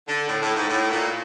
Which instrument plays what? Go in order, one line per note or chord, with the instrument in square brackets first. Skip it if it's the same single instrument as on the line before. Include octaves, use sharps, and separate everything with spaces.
[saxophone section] D3
A2
A2
G#2
A2
A#2